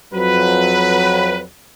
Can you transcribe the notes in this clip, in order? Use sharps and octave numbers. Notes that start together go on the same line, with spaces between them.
F2 F#3 B4